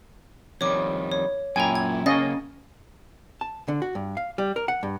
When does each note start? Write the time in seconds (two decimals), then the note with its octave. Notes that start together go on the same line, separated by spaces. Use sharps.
0.61 F2 D#3 G3 C#5 D6
1.11 C#5
1.56 F#2 A#2 E4 G5 G#5 A#5
1.75 G#6
2.06 C#3 A#3 C#4 D#5 F5 A6 A#6
3.41 A5
3.68 D3
3.82 F#4
3.95 G2
4.17 F5
4.38 G3
4.56 A#4
4.68 F#5
4.83 G2